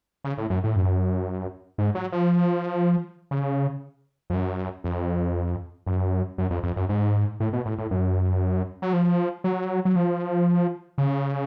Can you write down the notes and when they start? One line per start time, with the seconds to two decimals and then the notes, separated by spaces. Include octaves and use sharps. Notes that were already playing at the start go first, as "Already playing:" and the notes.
0.24 C#3
0.38 A2
0.50 F#2
0.64 A2
0.76 F#2
1.78 G#2
1.95 F#3
2.12 F3
3.31 C#3
4.30 F2
4.33 F#2
4.84 F2
5.86 F#2
6.38 F#2
6.51 F2
6.63 F2
6.76 F#2
6.89 G#2
7.40 A2
7.53 B2
7.66 A2
7.78 A2
7.91 F#2
8.82 F#3
8.93 F3
9.44 F#3
9.85 F#3
9.96 F3
10.98 C#3